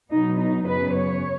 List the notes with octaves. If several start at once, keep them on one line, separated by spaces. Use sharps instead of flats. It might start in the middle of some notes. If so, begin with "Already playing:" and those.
B2 F#3 B3 D#4
D#4
F#2 C#3 B3 B4
C#5